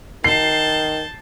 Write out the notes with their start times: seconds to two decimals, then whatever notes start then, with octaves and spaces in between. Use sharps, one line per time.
0.24 D#3 A5 G6 C7